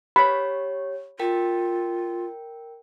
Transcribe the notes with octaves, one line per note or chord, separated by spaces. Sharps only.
G4 C#5 B5
F4 A#4 G5